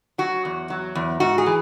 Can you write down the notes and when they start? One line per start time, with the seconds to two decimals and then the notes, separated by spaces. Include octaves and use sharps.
0.18 F#3 F#4
0.45 E2
0.70 F#3
0.95 E2
1.20 G#2 F#4
1.38 G#4
1.46 E3